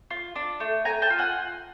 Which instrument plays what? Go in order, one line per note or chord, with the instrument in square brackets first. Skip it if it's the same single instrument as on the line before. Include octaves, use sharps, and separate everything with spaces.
[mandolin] F4
D4
A3
A3 G#5 A#5
G5 A5
F4
F#5 G#5